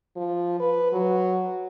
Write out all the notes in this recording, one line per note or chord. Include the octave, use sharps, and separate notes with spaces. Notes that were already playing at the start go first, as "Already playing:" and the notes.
F3
B4
F#3